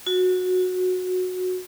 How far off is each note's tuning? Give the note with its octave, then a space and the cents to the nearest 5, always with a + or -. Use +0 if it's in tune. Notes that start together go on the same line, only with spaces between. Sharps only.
F#4 -15